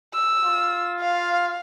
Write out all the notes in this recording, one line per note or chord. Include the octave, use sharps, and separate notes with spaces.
E6
F4
F5